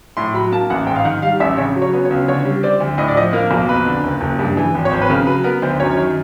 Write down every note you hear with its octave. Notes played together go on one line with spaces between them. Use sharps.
A2 C6
F#3 B5
A#3 A5
A1 F#5
G#2 G5
F5
D#3 F#5
G3 F5
A1 E5
C#3 C#5
F#3
C#5
B3
C#5
C#2
D3 C#5
G3
C4 D5
D2
A2 D#5
D5
F3 D#5
A#3 A#4
B1
F2 B4
D3
F#1
F#1
G2
E3
G#1
C#5
G#1 C5
B4
C#3 A#4
F#3 B4
B3 A#4
D2 C5
F#2 C#5
D#3